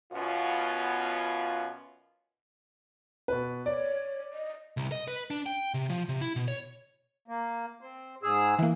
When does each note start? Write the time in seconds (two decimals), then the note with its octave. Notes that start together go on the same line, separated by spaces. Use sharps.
0.13 F#2 B2 B3 C#4 F4
3.28 B2 B4
3.66 C#5 D5
4.33 D#5
4.77 C2
4.92 D#5
5.08 B4
5.30 D4
5.46 G5
5.74 C3
5.89 F3
6.09 C3
6.21 E4
6.36 B2
6.48 C#5
7.28 A#3
7.81 C4
8.23 G#2 G#4 E6
8.59 E3 A#3